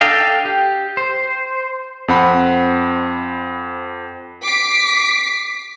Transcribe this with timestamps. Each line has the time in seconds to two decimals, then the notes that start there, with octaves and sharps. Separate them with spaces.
0.01 D4 A4 D#5 F5 G5
0.45 G4
0.97 C5
2.08 F2 C4 F#5 B5
4.43 D6 B6 C7